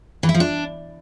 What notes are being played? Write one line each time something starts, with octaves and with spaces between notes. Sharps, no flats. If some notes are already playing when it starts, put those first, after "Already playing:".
E3
E4
F3
D4